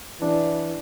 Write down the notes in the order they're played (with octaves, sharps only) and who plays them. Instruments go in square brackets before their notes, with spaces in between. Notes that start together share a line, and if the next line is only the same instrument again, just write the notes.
[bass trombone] E3 [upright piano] D4